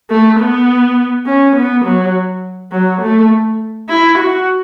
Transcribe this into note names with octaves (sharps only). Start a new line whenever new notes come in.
A3
B3
C#4
B3
F#3
F#3
A3
E4
F#4